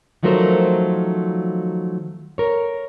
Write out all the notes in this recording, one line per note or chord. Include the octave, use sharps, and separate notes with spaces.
D#3 F3 F#3 A3 A#4 C5
A#4 C#5